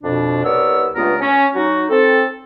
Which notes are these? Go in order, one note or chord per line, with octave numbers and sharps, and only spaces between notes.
F2 B2 D4
C2 B3 A#4 C#5 D5 E6
C#2 G2 A3 B3 F4 A#4
C#4
F#3 D#4 F#4
C4 A4